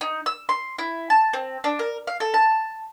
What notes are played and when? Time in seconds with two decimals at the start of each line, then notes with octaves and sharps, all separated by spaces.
0.01 D#4
0.26 E6
0.49 C6
0.79 E4
1.10 A5
1.33 C4
1.64 D4
1.79 A#4
2.07 F5
2.20 A4
2.34 A5